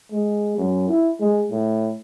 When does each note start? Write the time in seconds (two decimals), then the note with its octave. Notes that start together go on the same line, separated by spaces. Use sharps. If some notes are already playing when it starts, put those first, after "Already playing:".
0.12 G#3
0.58 F#2
0.89 E4
1.20 G#3
1.50 A2